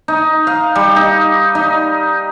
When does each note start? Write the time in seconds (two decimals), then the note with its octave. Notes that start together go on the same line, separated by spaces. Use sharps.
0.08 D#4
0.47 F5
0.75 G3
0.96 D#4
1.55 D#4